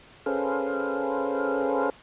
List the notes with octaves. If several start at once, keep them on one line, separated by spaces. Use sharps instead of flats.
C#4 G#4 A4 B4 C5 F5